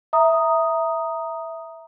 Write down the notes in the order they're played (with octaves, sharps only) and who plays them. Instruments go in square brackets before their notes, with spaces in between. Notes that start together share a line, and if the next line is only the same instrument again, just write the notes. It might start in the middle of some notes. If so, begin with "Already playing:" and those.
[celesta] E5 A#5 D#6